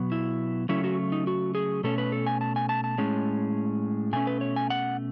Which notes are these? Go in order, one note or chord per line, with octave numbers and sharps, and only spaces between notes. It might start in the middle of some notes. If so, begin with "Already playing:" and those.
Already playing: B2 F#3 B3
E4
C#3 F#3 A3 C#4 E4
F#4
D#4
F#4
G#4
B2 A3 C#4 A4
B4
A4
G#5
A5
G#5
A5
A5
A2 G#3 C#4
B2 A3 C#4 G#5
B4
C#5
G#5
F#5